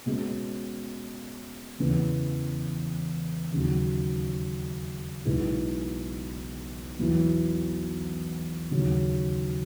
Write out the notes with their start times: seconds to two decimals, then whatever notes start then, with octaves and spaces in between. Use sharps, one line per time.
0.06 B2 G#3 C#4
1.79 E2 C#3 E3 B3
3.52 D#2 C#3 F#3
5.25 B1 B2 G#3 B3 E4
6.98 E2 B2 F#3 B3 E4
8.71 D#2 C#3 F#3 C#4